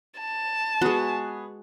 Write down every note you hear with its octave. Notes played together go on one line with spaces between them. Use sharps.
A5
G#3 B3 F#4 G#4